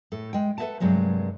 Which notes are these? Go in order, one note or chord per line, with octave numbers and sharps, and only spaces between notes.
A2 A4
G#3 G5
A4 B4 D5 E5 F#5 A5
G2 C3 F#3 G#3 A#3